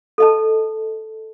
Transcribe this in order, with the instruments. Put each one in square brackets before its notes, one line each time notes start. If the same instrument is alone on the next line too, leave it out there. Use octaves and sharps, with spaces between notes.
[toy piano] A4 D#5 A5